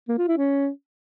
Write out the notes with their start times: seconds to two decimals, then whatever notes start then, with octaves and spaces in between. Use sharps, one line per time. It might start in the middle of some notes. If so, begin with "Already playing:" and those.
0.09 A#3
0.18 F4
0.28 E4
0.38 C#4